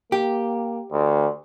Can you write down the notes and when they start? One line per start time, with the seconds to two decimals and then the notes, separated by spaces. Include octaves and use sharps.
0.12 A#3 G4
0.91 D2